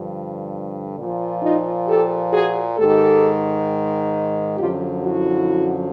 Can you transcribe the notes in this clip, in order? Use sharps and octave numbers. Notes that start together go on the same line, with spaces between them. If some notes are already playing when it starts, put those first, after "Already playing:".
Already playing: G2 D3 F3
A#2 F3
D#4 F4
G4 A4
F#4 G#4
G#2 D#3 G4 A4
F#2 D3 F3 F4 G4
E4 F#4